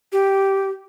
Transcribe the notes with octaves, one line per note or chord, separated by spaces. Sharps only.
G4